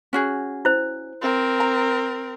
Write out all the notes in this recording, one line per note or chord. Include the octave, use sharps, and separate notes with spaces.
C#4 F#4 G#4
E4 C5
C4 A#4
A#5